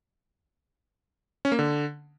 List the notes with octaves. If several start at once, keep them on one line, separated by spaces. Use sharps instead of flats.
C#4
A#3
D3